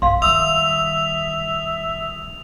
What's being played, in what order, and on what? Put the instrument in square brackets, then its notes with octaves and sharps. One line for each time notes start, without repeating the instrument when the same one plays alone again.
[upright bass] A#1 G2 [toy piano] F5 C6
[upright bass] D#3 G3 [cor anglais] E5 [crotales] D#6 F7 [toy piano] E6